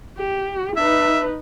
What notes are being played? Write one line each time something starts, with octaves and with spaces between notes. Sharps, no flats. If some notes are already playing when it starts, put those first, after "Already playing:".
G4
D#4 B4 E5